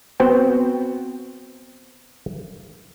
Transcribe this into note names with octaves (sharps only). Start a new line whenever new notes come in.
B3 C4 F#4 C5 G5